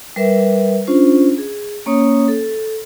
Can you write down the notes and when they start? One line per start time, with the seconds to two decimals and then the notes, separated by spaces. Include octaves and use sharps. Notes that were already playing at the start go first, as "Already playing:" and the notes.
0.16 G3 A#4 B4 E5
0.87 C#4 D4 F4 C5
1.38 G#4
1.86 A#3 C#4 C#5 D#6
2.28 A4